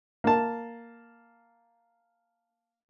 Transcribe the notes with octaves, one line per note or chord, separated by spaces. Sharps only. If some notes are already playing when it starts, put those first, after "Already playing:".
A#3 A5